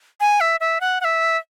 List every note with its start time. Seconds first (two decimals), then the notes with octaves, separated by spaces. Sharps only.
0.20 G#5
0.40 E5
0.60 E5
0.81 F#5
1.01 F#5
1.04 E5